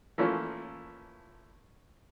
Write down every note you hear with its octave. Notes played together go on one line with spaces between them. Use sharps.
E3 F3 A3 A#3 C#4 F4